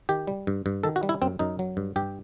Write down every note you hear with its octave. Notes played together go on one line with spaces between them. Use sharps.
D#3 G4
G3
G2
G2
D#3 A4
F#4
G3
E4
F#2 C4
F#2 D#4
F#3
G2
G2 G4